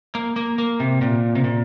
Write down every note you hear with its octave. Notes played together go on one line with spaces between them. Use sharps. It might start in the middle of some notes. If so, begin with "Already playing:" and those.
A#3
A#3
A#3
C3
A#2
C3
A#2